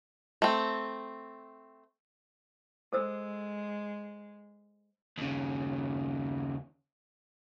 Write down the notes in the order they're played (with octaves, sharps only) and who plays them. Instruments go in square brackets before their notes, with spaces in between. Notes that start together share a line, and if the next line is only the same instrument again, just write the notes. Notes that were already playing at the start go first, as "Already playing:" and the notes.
[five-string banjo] A3 C4
[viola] G#3 [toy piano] A4 C5 E6
[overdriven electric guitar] D#2 C#3